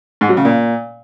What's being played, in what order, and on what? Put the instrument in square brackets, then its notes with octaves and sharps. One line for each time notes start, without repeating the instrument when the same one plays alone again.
[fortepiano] G#2
F#3
C#3
A#2